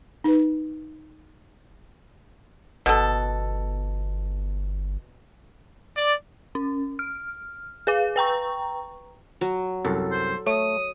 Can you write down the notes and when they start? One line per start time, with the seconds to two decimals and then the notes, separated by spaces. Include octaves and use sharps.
0.24 D#4 B4
2.86 G1 B2 A4
5.96 D5
6.55 C#4
6.99 F6
7.87 G#4 B4 F5
8.16 B4 G5 A#5 C#6
9.41 F#3
9.85 C2 F#2 A4
10.12 C5
10.47 A3 C#5 D#6